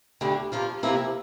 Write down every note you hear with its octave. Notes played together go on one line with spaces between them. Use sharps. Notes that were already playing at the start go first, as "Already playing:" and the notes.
D2 D3 G3 D4
G2 F3 A#3 F4
F2 C3 F3 A#3 E4